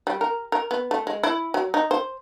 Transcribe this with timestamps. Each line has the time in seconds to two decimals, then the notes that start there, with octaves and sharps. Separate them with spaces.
0.07 G3
0.21 A#4
0.52 A#4
0.71 B3
0.91 A3
1.07 G#3
1.23 E4
1.54 F#3
1.74 D#4
1.91 C5